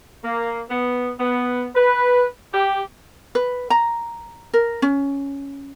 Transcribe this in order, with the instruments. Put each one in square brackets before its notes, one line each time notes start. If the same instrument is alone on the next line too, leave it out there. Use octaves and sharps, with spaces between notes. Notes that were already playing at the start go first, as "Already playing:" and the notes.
[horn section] A#3
B3
B3
B4
G4
[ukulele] B4
A#5
A#4
C#4